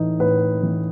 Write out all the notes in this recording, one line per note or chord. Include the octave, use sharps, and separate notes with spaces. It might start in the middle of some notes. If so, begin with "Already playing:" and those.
Already playing: A2 E3 D#4
A2 B4
E3